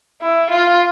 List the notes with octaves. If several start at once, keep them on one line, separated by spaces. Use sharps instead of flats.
E4
F4